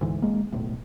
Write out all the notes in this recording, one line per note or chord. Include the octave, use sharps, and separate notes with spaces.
D2 G#2 E3
G#1 G#3 A#3
D#1 B1 A2